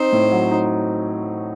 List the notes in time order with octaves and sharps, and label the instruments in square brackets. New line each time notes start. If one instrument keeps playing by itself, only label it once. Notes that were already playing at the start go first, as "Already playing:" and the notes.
Already playing: [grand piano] C4 D#4 [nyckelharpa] C5
[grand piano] A2
F#3
D#4